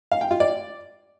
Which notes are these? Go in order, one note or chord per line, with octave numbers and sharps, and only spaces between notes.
F5
G5
F4
D5